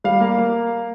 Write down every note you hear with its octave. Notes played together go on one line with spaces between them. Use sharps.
G3 F5
A#3
A#3